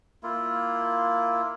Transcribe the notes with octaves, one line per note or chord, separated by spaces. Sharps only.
A#3 E4 F4